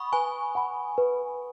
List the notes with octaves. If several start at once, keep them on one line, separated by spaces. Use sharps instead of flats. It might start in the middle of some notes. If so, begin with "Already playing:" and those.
Already playing: F#5 B5 C#6 D#6
B4 G#5
F#5 B5
B4